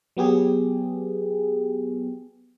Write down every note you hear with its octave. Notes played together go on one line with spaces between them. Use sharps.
F#3 B3 G4 G#4